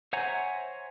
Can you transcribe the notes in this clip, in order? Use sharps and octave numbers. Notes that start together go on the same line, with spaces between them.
C5 C#5 E5 F#5 G#5 A#5